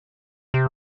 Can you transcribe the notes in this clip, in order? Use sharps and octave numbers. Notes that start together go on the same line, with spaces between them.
C3